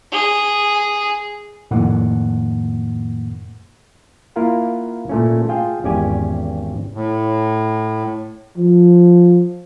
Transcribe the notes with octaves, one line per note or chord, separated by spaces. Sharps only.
G#4
F2 A2 D#3 A#3 F#5
A#3 E4 F4 A#4 F5 F#5
A#2 A3 C#4
F4 G#4 F5 G5
G#1 E2 C#4 G4 D5 G#5
A2
F3